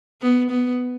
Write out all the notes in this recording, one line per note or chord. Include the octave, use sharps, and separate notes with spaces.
B3
B3